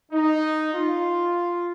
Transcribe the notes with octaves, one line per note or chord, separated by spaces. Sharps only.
D#4
F4